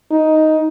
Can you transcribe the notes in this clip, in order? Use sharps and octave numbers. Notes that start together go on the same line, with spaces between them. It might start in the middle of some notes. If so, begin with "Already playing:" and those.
D#4